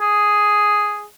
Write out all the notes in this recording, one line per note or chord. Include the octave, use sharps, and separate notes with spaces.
G#4